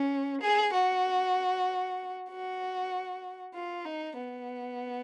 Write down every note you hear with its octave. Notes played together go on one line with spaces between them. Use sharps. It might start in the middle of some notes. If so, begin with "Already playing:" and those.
Already playing: C#4
G#4
F#4
F#4
F4
D#4
B3